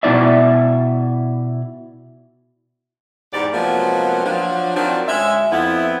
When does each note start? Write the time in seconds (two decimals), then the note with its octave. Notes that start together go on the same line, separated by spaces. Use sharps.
0.03 B2 G#3 E4 D5 E5
3.33 E2 G#2 G4 D5
3.53 C3 F3 F#3 G#3 A#3 B3
4.25 F3 F#3 D4
4.75 D#3 F3 F#3 C4 D4
5.08 D2 G#3 C#4 E5
5.51 F2 B3 E4